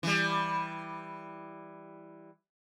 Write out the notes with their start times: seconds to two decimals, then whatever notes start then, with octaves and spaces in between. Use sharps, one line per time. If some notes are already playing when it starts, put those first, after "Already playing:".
0.03 E3 G3